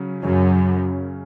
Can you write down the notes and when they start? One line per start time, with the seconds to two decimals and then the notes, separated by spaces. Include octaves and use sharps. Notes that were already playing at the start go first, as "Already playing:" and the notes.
Already playing: C#3 F#3 C#4
0.23 F#2 C#3 F#3 C#4